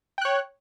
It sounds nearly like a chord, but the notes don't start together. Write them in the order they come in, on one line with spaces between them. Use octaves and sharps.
G5 F#6 C#5